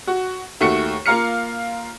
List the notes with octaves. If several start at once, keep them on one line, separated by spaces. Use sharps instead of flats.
F#4
D#2 A3 F#4 C#7
A#3 F4 F5 A#5 F6 C#7